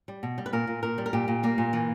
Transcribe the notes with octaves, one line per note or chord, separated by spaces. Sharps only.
G3
B2
G3
B4
A#2 A#4
A#2
A#2 A#4
G3
A#4
A#2 G4
A#2
G3 A#3
A#2
E3